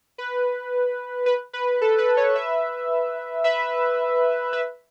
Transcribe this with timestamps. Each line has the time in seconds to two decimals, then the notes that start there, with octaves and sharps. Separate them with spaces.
0.18 B4
1.26 B4
1.53 B4
1.81 A4
1.99 B4
2.17 A4 C#5
2.35 B4 E5
3.44 B4 E5
4.53 B4 E5